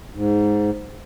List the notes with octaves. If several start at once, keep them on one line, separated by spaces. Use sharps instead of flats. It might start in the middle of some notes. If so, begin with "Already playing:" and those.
G#2